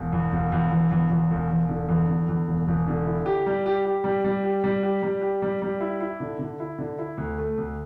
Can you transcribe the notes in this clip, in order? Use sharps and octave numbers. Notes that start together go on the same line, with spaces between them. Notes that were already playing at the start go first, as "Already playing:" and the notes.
Already playing: E1
E2
E1
E2
E1
E2
E2
E1
E1
D3
E2
D3
E2
E1
E1
D3
E4
G4
G3
G4
G4
G3
G3
G4
G3
G4
G3
G4
G3
G3
E4
E4
D3
D3
E4
D3
E4
D2
A3
D2